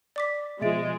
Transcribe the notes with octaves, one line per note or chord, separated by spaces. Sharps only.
D5 D6 B6
B2 F3 G#3 E5 A6 D7